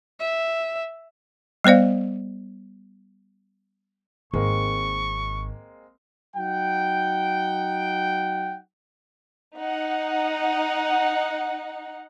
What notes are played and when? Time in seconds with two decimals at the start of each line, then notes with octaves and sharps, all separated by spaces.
0.20 E5
1.64 G3 B3 C5 D5 F5
4.34 G#1 G#3 A#3 C4 C#6
6.37 F#3 D#4 F#5 G5
9.59 D#4 F#5